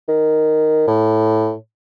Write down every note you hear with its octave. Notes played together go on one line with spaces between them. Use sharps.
D#3
A2